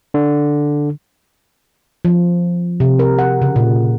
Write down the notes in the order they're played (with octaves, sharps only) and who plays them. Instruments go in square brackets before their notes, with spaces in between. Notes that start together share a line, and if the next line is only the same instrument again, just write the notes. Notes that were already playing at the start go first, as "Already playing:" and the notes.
[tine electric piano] D3
[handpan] F3
C3
A#4
F#5
C#3
A#2